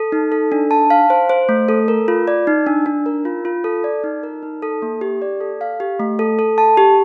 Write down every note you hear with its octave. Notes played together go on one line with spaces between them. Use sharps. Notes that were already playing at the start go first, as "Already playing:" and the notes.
Already playing: A4
D#4
A4
D4
A5
F5
C5
C5
A3
A4
A#4
F4
D5
D#4
D4
D4
A#4
F4
F4
A4
D5
D#4
A#4
D#4
A4
A#3
G4
D5
A4
F5
G4
A3
A4
A4
A5
G4